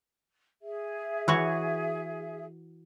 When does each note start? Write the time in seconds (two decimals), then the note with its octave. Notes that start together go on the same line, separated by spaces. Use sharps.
0.62 G#4 E5
1.28 E3 F#4 C#5